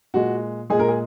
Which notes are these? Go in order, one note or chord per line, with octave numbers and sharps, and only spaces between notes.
A#2 G#3 F#4
A#2 G#3 G#4
A#4
G#4